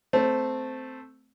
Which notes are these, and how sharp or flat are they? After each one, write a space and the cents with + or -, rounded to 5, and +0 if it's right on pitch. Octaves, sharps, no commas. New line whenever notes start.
A3 +0 C4 -10